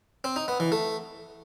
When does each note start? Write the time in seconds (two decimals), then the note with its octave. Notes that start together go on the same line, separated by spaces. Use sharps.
0.24 C4
0.36 D#4
0.48 B3
0.60 E3
0.72 A3